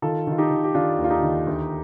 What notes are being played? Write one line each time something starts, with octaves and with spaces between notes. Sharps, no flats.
D#3 F4 A4
D#3
F4
D#4 G4
D#3
G4
D#3 D4 F4
D#2
F4
D#4 G4
D#3
D2